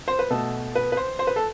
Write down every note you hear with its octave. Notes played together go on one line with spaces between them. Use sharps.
C5
B4
B2 A3 A4
B4
B4
C5
C5
B4
A4